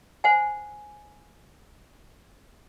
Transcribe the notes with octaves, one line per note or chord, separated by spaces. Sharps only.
C5 F#5 G#5